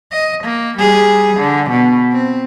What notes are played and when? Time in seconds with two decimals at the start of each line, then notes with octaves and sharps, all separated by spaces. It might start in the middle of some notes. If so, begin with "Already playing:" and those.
0.12 D#5
0.44 A#3
0.78 G3 G#4
1.37 D3
1.71 B2
2.12 C4